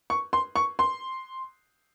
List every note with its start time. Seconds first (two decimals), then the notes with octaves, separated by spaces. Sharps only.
0.10 C#6
0.33 C6
0.56 C#6
0.79 C6